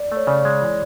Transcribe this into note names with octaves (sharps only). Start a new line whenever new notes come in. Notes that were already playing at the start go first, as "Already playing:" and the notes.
Already playing: D5
A3
C#5
C#3 D5
G#3
E3